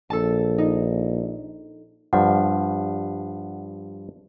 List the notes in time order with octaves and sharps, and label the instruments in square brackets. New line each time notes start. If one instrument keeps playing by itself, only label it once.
[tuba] A#1 [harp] A4 A5
[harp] D#4
[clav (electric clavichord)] G2 F3 [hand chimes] F#5